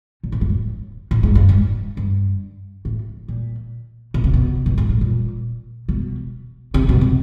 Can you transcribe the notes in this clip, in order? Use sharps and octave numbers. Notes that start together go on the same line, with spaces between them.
A#2
A2
G#2
A2
A2
G#2
G2
G#2
G2
A2
A#2
B2
C3
B2
G2
G#2
A2
A#2
B2
C3
B2
C3